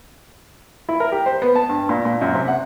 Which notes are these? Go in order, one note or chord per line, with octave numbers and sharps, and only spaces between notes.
E4
A#4
G4
C5
B3
A5
G2
A#2
A#2
F#2
C3
F#5